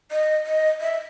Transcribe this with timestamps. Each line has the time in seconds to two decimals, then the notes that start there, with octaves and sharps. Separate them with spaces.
0.12 D#5
0.46 D#5
0.81 E5